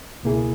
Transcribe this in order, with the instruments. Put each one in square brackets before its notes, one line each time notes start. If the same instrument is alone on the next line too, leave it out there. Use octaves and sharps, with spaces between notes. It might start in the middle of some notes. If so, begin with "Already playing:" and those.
[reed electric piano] C#2 B2 A#3 E4 G#4